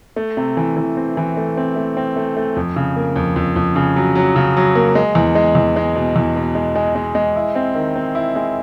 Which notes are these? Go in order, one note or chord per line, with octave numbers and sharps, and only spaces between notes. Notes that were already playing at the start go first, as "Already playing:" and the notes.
A3
C3
E3
E3
C4
E3
A3
C4
A3
C4
A3
A3
F2
C#3
A#3
F2
F2
F2
C#3
F#3
F#3
C#3
F#3
A#3
G#3
E2
G#3
E2
G#3
B2
E2
B2
G#3
G#3
G#3
G#3
E4
C4
D#3
C4
E4
G#3